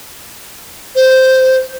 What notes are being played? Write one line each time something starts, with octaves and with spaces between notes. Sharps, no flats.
C5